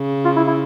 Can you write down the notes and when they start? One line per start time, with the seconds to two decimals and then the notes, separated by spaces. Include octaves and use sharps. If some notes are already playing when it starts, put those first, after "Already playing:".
Already playing: C#3
0.25 F4
0.36 E4
0.47 E4